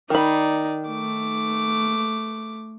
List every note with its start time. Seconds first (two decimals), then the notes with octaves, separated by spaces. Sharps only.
0.10 D#3 D#4 D5 B5
0.89 A3 D6